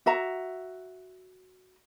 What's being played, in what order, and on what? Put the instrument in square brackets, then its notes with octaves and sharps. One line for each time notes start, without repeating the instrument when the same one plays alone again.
[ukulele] F#4 E5 A#5